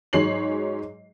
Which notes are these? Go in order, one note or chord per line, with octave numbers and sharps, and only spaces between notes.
G#2 F#3 G#4 C#5 C7 F#7